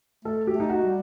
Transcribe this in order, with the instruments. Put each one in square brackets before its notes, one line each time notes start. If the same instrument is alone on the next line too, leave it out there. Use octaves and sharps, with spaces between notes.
[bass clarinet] A3 [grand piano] A4
[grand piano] G4
[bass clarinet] A3
[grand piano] D#4
F#4
[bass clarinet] G3